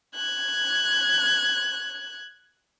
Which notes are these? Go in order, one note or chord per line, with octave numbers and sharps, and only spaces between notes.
F#6 G#6